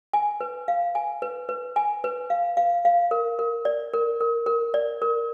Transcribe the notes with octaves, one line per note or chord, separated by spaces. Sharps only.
G#5
B4
F5
G#5
B4
B4
G#5
B4
F5
F5
F5
A#4
A#4
D5
A#4
A#4
A#4
D5
A#4